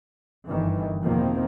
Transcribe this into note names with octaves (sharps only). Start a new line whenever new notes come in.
G1 D#3 E3
E2 B2 D#3 F3 A#3 C4